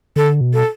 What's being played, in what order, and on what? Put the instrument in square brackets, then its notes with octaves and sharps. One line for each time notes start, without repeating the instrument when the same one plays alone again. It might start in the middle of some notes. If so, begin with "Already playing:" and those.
[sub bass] D3 [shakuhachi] A4
[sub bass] B2
[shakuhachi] A4